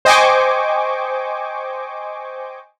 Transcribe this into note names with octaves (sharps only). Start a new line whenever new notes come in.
C5 D#5 G5 G#5 C#6 D6